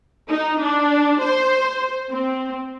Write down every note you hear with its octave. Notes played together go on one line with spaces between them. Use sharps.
D#4
D4
C5
C4